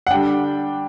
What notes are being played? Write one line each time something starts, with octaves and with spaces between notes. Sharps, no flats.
F#5
D3 G3 D4 G5